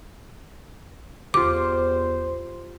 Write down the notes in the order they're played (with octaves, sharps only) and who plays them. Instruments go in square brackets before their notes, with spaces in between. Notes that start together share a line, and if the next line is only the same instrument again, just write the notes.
[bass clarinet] E2 [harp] F4 G4 [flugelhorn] C5 [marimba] D6